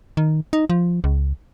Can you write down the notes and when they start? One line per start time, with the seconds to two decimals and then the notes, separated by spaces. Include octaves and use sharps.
0.17 D#3
0.53 D#4
0.70 F3
1.04 C#2